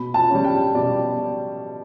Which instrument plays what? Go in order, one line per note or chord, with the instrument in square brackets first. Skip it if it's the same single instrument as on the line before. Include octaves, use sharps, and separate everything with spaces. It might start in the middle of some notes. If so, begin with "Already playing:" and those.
Already playing: [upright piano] B2 B5
A5
G3 C#4
G5
B2 D5